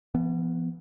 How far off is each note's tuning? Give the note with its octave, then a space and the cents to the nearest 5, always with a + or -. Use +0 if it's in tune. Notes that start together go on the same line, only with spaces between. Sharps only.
F3 -45 B3 +0